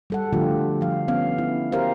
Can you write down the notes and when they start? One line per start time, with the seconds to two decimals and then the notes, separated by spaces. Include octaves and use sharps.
0.10 G3 A4 F#5
0.33 D3 F3 A3 F4 G4
0.81 F3 F5
1.08 B3 C#4 F5
1.38 E4
1.72 G4 A#4 C5 F5